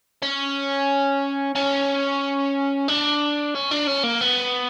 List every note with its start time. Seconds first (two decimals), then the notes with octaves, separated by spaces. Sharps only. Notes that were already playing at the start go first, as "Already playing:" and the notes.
0.23 C#4
1.55 C#4
2.88 D4
3.55 C#4
3.71 D4
3.87 C#4
4.03 A#3
4.21 B3